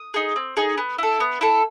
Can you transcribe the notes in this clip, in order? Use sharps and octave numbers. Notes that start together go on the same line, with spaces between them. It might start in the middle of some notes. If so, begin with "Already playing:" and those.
Already playing: D#6
D#4 G#4
C4
D#4 G#4
B3
E4 A4
B3
E4 A4